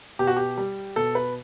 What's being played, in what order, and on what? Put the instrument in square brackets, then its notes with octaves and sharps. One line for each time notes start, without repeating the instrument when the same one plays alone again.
[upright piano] B2 G4
F#4
G4
G3
B2 A4
B4